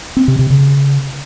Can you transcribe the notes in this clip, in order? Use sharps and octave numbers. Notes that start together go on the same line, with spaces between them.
C4
C3
C3
C#3